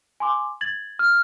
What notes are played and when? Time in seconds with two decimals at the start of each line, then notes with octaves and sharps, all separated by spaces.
0.20 G#5 C6 D6
0.61 G#6 A6 F#7
0.99 F6